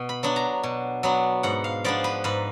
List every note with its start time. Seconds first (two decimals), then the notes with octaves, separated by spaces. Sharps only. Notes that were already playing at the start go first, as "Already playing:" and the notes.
Already playing: B2
0.09 B5
0.23 F#3 B3 D4
0.36 A#5
0.63 B2
1.03 F#3 B3 D4
1.43 G#2 F#5
1.64 F5
1.84 F3 B3 D4 D5
2.04 B4
2.24 G#2 B4